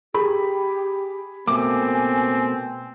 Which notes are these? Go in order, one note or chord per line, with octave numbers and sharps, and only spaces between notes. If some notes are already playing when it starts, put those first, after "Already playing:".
G4 G#4 B5
B2 A3 A#3 C4 G#5 D6